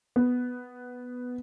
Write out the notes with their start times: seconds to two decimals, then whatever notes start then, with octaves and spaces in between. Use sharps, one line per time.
0.16 B3